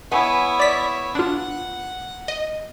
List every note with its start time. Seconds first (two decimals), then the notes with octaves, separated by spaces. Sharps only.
0.12 B3 E4 C#5 G#5
0.59 D5 B6
1.15 D4 F4 F#5
2.28 D#5